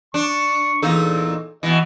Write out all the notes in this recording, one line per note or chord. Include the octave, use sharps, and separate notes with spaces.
D4 C#6
E2 A#2 D#4 A4
B2 E3 D#5